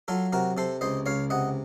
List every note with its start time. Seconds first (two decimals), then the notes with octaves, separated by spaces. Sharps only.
0.08 F#3 F4 A4
0.33 C3 F#4 A#4
0.57 C3 A4 C5
0.81 C#2 C5 D#5
1.06 C#2 C#5 F5
1.30 C3 D#5 F#5